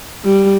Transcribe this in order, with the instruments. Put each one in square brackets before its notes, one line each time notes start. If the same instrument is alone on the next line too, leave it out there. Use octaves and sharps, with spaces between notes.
[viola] G3